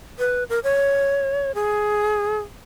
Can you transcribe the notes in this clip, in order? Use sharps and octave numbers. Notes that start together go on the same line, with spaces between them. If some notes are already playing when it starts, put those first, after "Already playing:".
B4
A#4
C#5
G#4